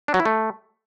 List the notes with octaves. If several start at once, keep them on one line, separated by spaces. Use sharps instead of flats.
D4
F#3
E4
A3